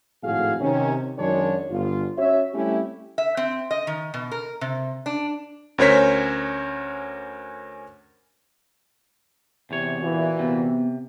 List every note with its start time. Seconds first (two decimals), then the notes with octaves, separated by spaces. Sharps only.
0.24 G#1 F2 A2 F#4 G#4 F5
0.61 C3 D#3 C#4
1.18 F#2 D#3 F#3 G#3 D4 C#5
1.70 G1 F4
2.18 C#4 F#4 C#5 E5
2.54 G3 A3 C4 C#4 E4 G4
3.18 E5
3.37 C4
3.71 D#5
3.87 D#3
4.14 B2
4.32 A#4
4.61 C3
5.06 D4
5.78 D2 C#4 A#4 C5 C#5 B6
9.71 E2 C3 C#5
10.02 A#2 E3 F#4 G#4
10.39 C3 B3